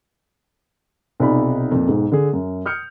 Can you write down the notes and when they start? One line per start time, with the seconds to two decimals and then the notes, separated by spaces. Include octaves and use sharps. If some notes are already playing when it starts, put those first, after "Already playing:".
1.20 B1 C3 D#4 F4 D5 B5
1.71 F2 A#2
1.88 B1 G#2
2.12 D3 G#4
2.33 F#2
2.66 D#6 F6 G6 C#7